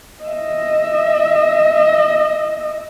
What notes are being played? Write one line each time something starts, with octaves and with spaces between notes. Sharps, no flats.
D#5 E5